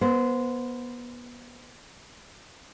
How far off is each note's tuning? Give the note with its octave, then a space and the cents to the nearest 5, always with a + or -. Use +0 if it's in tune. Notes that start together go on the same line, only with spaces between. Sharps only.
B3 -30 C5 -15